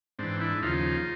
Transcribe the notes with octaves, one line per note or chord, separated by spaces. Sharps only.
G#2 E3 C4 D4
D4 E4
D#2 C#3 F3 D#4 F4